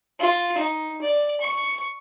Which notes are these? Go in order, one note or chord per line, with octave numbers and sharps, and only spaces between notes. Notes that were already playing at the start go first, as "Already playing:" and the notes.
F4
D#4
D5
C#6